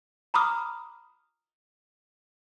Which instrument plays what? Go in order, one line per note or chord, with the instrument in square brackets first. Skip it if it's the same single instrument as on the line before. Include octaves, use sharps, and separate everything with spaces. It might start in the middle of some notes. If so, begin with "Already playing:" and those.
[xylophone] A#5 B5 D6 D#6 F6